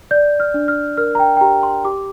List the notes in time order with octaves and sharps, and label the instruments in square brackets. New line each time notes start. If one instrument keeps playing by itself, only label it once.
[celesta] D5 G6
F6
D4
F6
A#4 F6
A#5
G5
G5
G4 A#5
C6
G4 D6